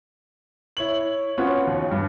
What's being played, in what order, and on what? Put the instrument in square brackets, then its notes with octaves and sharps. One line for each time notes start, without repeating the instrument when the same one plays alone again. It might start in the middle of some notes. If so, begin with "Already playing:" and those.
[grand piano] E4 C#5 F#7
B3 C#4 F4 F#4 B4 C#5
D#2
G2